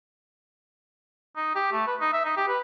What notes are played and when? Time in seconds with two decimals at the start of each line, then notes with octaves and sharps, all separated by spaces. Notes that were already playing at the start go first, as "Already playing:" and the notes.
1.36 D#4
1.56 G4
1.72 A3
1.87 B4
2.00 D#4
2.13 E5
2.25 D#4
2.37 G4
2.48 B4